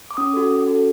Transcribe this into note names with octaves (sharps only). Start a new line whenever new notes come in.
D6
C#4 D#6
F#4 A4
C#4
F#4 A4